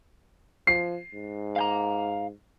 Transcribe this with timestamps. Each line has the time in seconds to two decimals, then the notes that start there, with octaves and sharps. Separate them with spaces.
0.67 F3 C7
1.14 G#2
1.56 F5 G5 A#5